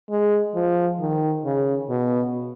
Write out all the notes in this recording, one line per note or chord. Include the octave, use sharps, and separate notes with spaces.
G#3
F3
D#3
C#3
B2